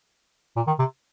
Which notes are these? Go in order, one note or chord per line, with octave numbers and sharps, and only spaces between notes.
A#2
D#3
C3